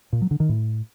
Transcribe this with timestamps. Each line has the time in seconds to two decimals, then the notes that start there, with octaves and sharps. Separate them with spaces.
0.13 A#2
0.22 F#3
0.31 D3
0.40 D#3
0.49 A2